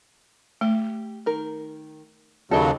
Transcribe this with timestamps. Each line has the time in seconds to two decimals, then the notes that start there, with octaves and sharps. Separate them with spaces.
0.61 A3 G4
1.26 D#3 A#4
2.51 D#2 C#3 F#3 D4 A4 D#5 G5